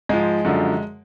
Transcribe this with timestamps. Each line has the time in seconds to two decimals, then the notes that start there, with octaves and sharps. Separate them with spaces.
0.09 G#2 F3 G#3
0.45 F#2 D3 F3